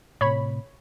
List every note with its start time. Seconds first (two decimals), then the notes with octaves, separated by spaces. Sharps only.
0.21 A2 C3 C#5 B5